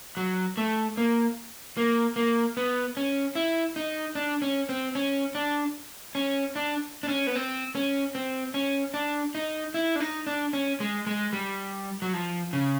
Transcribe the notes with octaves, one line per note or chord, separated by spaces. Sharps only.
F#3
A3
A#3
A#3
A#3
B3
C#4
E4
D#4
D4
C#4
C4
C#4
D4
C#4
D4
D4
C#4
B3
C4
C#4
C4
C#4
D4
D#4
E4
D4
D#4
D4
C#4
G#3
G#3
G3
F#3
F3
C#3